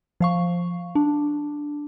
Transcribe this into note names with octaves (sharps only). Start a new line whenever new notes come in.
F3 F5 C#6
D4